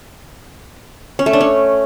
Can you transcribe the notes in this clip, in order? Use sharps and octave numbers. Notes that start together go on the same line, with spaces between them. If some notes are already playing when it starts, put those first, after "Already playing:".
C#4
A3
D4
C#4